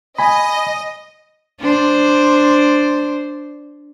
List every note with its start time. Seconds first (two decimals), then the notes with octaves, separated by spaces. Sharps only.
0.18 D#5 G#5 B5
1.60 D4 C5